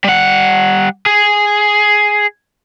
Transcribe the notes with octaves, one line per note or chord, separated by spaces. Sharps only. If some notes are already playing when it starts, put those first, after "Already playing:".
G3 F#5
G#4